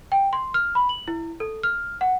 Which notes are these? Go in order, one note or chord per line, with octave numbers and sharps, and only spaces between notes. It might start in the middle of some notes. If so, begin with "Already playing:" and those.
G5
C6
F6
B5
F#7
E4
A4
F6
F#5